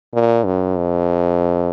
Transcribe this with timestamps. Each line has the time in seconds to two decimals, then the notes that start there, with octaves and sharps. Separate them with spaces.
0.14 A#2
0.45 F#2
0.77 F2